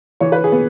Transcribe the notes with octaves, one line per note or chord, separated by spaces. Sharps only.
E3 C#5
B4
G#4
B3